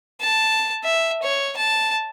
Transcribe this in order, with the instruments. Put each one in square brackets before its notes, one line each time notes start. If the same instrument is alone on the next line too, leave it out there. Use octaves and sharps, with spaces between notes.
[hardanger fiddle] A5
E5
C#5
A5